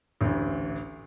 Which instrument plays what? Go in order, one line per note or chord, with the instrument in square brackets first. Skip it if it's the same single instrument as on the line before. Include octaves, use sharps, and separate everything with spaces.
[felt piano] A1 D2